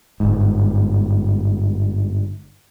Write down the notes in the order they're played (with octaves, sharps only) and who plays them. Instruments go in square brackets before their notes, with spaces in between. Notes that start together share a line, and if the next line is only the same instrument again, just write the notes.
[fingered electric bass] G1 G#2